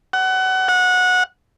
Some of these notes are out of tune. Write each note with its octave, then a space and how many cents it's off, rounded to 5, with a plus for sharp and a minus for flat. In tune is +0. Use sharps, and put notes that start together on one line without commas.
F#5 +25
F#5 -20